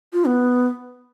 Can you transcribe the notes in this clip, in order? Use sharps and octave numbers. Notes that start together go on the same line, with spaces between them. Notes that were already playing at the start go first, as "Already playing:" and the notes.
F4
B3